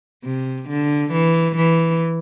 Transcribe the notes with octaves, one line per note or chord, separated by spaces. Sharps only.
C3
D3
E3
E3